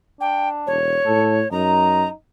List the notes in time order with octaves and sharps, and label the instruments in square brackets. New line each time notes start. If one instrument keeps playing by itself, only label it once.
[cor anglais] D4 [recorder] G5
[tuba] E1 [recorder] C#5
[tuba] A2 [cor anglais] A4
[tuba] F#2 [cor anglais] D#4 [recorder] A#5